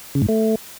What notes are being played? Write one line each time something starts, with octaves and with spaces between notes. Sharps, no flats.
C#3
G#2
A3